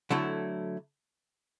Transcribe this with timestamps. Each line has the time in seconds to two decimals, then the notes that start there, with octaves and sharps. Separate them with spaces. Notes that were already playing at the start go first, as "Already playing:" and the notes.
0.10 D3 F#3 A3 E4 A4